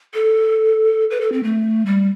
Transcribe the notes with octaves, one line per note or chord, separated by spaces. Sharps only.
A4
B4
A4
C4
A3
G3